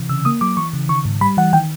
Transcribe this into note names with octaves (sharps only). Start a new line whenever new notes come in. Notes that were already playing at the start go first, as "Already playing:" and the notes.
Already playing: C3 E3
C#3 E6
A#3 D#6
F#3 D6
E3 C#6
C#3
D#3 C#6
G#2
G3 B5
E3 F#5
D#3 G5